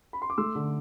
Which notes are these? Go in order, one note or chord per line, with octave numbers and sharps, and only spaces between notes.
B5
C6
D6
A3 C6 E6
D3